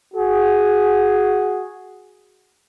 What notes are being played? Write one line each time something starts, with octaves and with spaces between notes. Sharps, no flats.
F#4 G#4